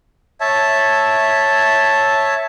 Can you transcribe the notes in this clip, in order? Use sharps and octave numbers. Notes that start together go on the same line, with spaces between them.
C#5 E5 A5